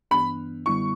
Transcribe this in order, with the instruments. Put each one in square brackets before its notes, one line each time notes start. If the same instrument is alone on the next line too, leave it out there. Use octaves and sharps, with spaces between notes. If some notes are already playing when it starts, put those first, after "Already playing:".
[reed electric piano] G2 E3 B3 D4 [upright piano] B5
[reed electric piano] F#2 D3 G3 B3 E4 [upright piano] C#6